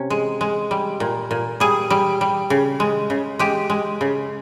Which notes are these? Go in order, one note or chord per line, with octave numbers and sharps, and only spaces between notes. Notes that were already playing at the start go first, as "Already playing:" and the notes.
Already playing: C3 C#4
G#3
G#3
G3
A#2
A#2
G3 G#4
G3
G3
C#3
G#3
C#3
G#3 G4
G#3
C#3